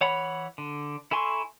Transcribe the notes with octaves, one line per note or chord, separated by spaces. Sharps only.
E3 C#5 F#5 B5
D3
E4 A4 G#5 C6 C#6